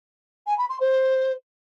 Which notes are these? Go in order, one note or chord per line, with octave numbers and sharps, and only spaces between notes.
G#5
B5
C6
C5